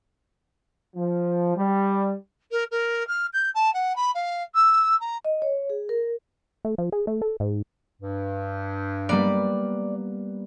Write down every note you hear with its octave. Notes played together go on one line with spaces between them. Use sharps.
F3
G3
A#4
A#4
F6
G6
A5
F#5
B5
F5
E6
A#5
D#5
C#5
G#4
A#4
A3
F3
G#4
A3
A4
G#2
G2
G3 A#3 B3 D5